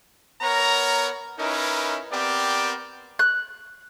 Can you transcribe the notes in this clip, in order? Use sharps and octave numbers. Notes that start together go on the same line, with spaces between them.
B3 A#4 C#5 A#5
C#4 D#4 E4 A#4 B4
B3 C4 G4 A#4 D5
F#6